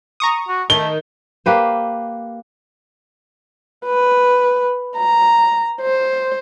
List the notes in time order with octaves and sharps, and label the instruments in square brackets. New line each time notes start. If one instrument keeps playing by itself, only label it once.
[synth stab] A#5 C#6 D#6
[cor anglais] F#4
[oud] D#3 [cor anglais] A3 [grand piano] G7
[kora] A#3 G4 B4 C5
[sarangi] B4
A#5
C5